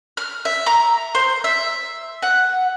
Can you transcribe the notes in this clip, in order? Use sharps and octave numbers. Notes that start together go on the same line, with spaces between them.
F6
E5
A#5
C5
E5
F#5